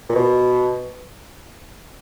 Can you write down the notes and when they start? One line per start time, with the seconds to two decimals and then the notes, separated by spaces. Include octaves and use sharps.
0.09 A#2
0.15 B2